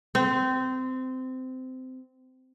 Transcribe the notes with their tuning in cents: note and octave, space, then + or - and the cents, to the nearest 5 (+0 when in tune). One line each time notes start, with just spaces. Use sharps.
C4 -20